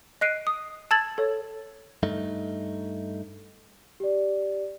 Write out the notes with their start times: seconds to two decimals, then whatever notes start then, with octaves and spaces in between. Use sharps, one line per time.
0.21 D#5 F#6 C7 D7 D#7
0.47 D#6
0.91 A5 E6 G#6 A6 F#7
1.18 A4 C#5
2.03 G2 A3 D#4
4.00 G4 D5